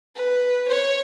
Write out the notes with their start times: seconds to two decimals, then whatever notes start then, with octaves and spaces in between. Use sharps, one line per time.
0.16 B4
0.69 C#5